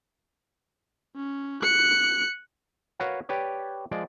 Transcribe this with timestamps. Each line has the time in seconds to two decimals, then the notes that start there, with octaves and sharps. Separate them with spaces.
1.16 C#4
1.63 F#6 C#7
3.00 F#4 A#4 B4 C#5 F5 F#5
3.29 G4 B4 C#5 D5
3.91 F3 G#3 D5